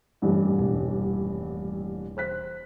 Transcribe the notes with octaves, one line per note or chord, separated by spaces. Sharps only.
D#1 A1 G2
E1
C5 F#6 B6